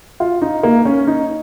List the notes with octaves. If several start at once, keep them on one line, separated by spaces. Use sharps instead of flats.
F4
D#4
A#3
C#4
D#4